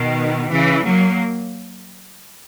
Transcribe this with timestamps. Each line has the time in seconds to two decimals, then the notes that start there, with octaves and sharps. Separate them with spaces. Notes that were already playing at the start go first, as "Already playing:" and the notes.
Already playing: B2 D#3
0.50 C#3 E3
0.84 F#3 A#3